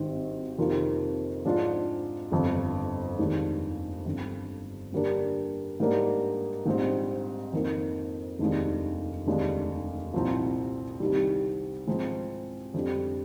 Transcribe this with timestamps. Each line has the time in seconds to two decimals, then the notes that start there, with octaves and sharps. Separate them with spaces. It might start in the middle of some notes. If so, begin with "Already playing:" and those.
Already playing: G#1 G2 D#3 G3 C4
0.58 F2 C3 D#3 A#3 F4
1.45 G#2 F3 G#3 D4 F4
2.31 G1 F2 D3
3.18 F1 D#2 D#3 G#3 D4
4.06 G1 F2 D3
4.93 G2 D3 G3 A#3 D4
5.80 G#2 G3 A#3 D4
6.65 A#1 G#2 G3 C4
7.53 F2 D#3 A#3
8.39 F1 D#2 D#3 G#3 D4
9.26 F1 D#2 D3 G#3 D4
10.14 C2 A#2 F3 C4 D#4
11.00 C2 C3 D#3 G3
11.87 G#2 F3 G#3 C4 D#4
12.74 F2 D3 G3